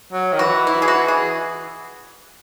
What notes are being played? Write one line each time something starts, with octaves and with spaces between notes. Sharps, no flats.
F#3
D#3
E3 F#4
E4
G#4
F#4
G#4